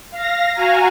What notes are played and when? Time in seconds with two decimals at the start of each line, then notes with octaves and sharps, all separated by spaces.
0.11 F5 A#6
0.54 F#4 F5 G#5 A#5